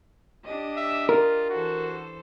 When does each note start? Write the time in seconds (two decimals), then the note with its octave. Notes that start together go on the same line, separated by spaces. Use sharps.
0.44 D4 G4 D#5
0.77 E5
1.09 F4 A#4
1.50 E3 F#4 A4 C5